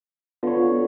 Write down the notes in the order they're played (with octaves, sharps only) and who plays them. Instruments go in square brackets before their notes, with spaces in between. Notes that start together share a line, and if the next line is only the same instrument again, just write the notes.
[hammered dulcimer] D3 C#5 [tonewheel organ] B3 F4